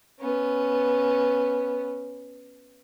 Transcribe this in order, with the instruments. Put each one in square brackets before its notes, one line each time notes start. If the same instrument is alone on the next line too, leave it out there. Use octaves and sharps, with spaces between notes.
[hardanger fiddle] B3 C#4